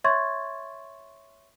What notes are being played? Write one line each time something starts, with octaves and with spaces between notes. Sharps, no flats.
C#5 E5 C6 C#6 G#6 A6